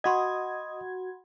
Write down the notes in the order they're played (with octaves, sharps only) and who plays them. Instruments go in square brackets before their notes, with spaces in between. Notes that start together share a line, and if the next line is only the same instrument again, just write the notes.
[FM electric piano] F#4 G#6 [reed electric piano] D#5 D#6 [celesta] F#5 B5 C6